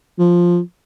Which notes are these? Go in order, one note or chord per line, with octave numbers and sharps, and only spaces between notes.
F3